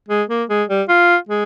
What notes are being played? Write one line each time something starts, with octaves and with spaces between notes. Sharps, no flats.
G#3
A#3
G#3
G3
F4
G#3